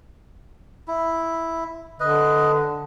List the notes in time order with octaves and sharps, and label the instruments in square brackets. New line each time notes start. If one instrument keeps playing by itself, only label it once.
[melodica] E4
[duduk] D3 [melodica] B4 D#5